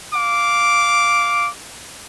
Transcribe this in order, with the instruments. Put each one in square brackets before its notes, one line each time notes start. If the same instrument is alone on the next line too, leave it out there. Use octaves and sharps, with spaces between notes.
[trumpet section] F5 D6